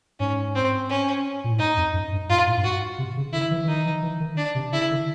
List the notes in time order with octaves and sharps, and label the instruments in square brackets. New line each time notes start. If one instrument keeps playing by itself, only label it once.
[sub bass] G#2 [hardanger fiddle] C#4
[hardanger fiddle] C4
C#4
[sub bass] A#2
A2
[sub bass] G#2 [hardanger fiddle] D#4
[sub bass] F2
F#2
G2
[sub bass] G#2 [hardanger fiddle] F4
[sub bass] A2
G2
[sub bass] G#2 [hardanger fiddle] F#4
[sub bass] C3
C#3
[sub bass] D3 [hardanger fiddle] E4
[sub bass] E3
E3
[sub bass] D#3 [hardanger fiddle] D#4
[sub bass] E3
E3
D#3
[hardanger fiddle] D4
[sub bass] C3
[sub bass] C#3 [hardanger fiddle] E4
[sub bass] D3